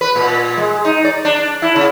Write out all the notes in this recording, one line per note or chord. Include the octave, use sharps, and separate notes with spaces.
B4
A#2
G#3
D#4
D5
D4
E4
C#3